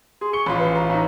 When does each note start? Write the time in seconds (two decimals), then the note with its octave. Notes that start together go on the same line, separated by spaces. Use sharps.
0.21 G#4 C6
0.33 C#6 C#7 G7
0.46 A1 F4 B5
0.59 B4
0.76 A#5
0.90 A2 D#4